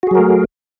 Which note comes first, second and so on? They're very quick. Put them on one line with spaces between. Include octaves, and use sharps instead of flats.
F#4 G#4 F#3 A#4 A3